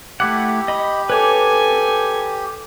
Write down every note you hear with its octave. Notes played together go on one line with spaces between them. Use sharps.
A3 E4 G4 F#5
D#5 B5
A4 B4 C#5 G#5 D6